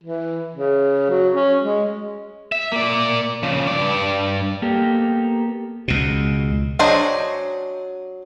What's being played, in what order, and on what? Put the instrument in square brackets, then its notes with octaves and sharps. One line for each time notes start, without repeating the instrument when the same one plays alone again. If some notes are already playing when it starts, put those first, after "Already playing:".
[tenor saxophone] E3
C#3
F#3
C#4
G#3
[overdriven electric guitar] E5
A#3 D5
C#3 F3
G2 D5
[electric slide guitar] A#3 B3 G4 A4
[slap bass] C#2 B2
[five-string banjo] F#3 D4 G#4 C5 D#5